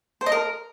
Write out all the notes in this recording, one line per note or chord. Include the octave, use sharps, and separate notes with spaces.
C5
D#5
A#4